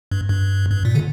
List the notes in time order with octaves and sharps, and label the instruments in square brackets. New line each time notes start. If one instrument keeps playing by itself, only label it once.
[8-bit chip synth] G2
G2
G2
A#2
D3